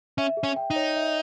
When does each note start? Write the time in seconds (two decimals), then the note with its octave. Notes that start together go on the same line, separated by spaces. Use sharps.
0.18 C#4 E5
0.37 G#4
0.43 C#4
0.56 G5
0.70 D#4
0.76 C#5
0.96 E5